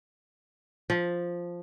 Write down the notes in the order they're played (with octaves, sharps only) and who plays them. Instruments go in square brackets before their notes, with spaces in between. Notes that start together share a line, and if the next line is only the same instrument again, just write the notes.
[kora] F3